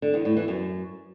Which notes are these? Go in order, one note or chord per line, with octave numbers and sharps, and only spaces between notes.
D3
E2
A2
E3
F#2